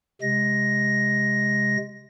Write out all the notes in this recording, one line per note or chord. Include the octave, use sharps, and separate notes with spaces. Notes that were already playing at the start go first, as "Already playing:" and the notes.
C3 G#3 A#6